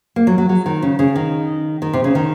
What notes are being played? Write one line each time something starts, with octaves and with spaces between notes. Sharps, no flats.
A#3
F#3
F#3
F#3
D#3
C#3
C#3
D#3
D#3
C3
C#3
D#3